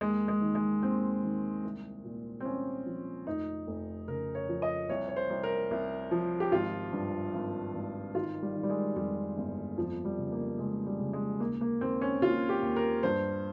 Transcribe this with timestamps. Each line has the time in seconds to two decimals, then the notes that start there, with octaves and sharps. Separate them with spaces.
0.01 D#2 G#3
0.28 G#3
0.41 D#3
0.55 G#3
0.82 D#2 C4
1.23 D#3
1.64 C2
2.04 A#2
2.40 C4
2.45 C2 C#4
2.86 F3
3.27 F1 D#4
3.67 F1
4.08 C#3 A#4
4.35 C#5
4.49 F3
4.62 D#5
4.89 C2 C#5
5.09 C#5
5.16 C5
5.30 C2
5.43 A#4
5.71 C2
6.11 F3
6.40 G4
6.52 G#1 F4
6.93 G2
7.34 G#1
7.74 G#1
8.15 D#3 F4
8.42 G3
8.55 D#3
8.63 G3
8.70 G#3
8.96 F2 G3
9.37 G1
9.78 F2 F3
10.05 G3
10.18 C#3
10.32 A#3
10.58 C#3 G#3
10.86 G3
10.99 C#3
11.13 G#3
11.40 D#2 A#3
11.61 A#3
11.81 D#2 C4
12.01 C#4
12.22 D#2 F4
12.49 G4
12.62 D#2
12.76 A#4
13.03 G2 C5